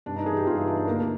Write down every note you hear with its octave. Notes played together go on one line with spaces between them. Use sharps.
G2 D4
D#4
E3 G#4
G4
G2 F4
E4
E3 D4
D4
D2 A#3